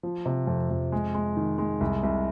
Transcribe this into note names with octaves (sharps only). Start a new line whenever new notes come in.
F3
C3
F2
F2
G#3
G#3
D#3
G#3
C2
C2